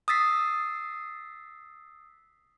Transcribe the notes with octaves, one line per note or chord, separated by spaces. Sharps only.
D#6 E6 A6 B6 C7